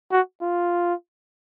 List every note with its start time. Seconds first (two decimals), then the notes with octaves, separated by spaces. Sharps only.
0.12 F#4
0.42 F4